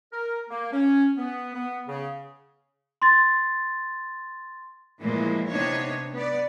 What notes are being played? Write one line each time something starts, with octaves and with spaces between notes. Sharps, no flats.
A#4
A#3
C#4
B3
B3
C#3
C6 A6
A#2 E3 F3 G#3
C3 B3 D4 D#4 C#5
B3 D5